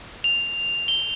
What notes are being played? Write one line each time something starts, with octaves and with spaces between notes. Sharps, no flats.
F7
G7